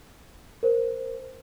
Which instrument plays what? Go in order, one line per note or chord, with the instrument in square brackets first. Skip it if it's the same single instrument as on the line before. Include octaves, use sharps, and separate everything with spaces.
[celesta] A#4 C5